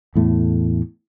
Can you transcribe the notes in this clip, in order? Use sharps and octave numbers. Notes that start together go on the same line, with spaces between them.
E2 A2 A3